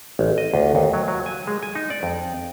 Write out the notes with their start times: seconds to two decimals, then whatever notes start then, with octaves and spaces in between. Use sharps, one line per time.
0.19 A1
0.38 D#5
0.54 D2
0.75 D#2
0.93 F#3
1.08 F#3
1.26 G#5
1.47 G#3
1.63 G#5
1.75 D#4
1.90 D5
2.03 F2